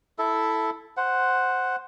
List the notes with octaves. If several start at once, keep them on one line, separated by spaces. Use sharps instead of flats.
E4 A4 E5
C5 F#5